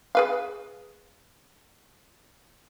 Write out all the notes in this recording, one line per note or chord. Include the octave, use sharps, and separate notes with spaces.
G#4 B4 F5